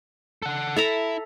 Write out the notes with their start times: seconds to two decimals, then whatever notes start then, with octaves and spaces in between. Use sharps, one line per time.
0.42 A4 F#5
0.76 E4 A4 E5 A#5